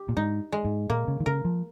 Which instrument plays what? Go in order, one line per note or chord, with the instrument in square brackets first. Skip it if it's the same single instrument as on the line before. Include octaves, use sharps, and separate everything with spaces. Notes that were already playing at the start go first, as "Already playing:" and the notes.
Already playing: [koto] G4
[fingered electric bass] A#2
[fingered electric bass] G#2 [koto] D#4
[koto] G#3
[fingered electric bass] G#2
[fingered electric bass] A#2 [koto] A#3
[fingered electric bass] C#3
D#3
[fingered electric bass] C#3 [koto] A#4
[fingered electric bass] F3